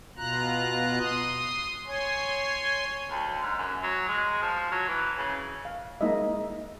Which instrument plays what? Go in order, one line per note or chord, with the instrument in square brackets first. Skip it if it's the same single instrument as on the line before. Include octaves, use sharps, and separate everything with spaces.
[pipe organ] B2 F4 A#5 F#6
C6 D#6
C#5 G#5 C6
[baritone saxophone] D2
G#2
F#2
F#3
G#3
F3
F#3
E3
C#3
[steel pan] F5
G#3 A#3 D#4 E4 D#5 E5